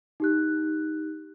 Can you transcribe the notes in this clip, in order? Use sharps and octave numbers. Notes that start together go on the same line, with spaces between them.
D#4 G4 F#6